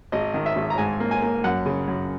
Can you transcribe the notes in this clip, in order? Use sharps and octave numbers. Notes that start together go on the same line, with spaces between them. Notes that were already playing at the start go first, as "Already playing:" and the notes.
G#1 D#5
D#3
E5
G#1
A#5
G#2 G#5
A#3
G#5
A#3
F#2 F#5
C#3
F#2